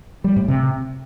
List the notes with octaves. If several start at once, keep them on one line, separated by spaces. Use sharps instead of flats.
G3
A2
C3